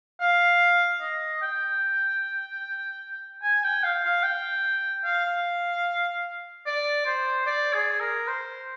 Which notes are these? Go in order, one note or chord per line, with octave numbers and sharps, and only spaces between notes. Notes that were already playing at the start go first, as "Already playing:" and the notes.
F5
D#5
G5
G#5
G5
F5
F5
G5
F5
D5
C5
D5
G#4
A#4
C5